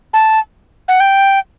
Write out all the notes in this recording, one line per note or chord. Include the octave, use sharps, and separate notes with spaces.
A5
F#5
G5